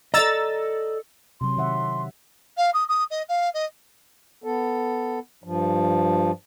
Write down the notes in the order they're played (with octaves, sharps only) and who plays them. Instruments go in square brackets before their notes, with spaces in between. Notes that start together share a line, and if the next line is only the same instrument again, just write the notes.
[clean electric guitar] A4 D5 D#5 [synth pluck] A#5 E6 A6
[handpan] C3 F#3 [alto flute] C6
[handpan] D#3 E5 F#5
[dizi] F5
D#6
D#6
D#5
F5
D#5
[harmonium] B3 A4
G2 F3